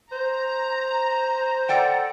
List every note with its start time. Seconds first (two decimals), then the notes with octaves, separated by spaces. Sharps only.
0.12 C5 A#5
1.69 A4 D5 F#5 G5